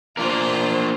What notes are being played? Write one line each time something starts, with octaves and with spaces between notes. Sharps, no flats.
A#3 D4 F4 A#4 C5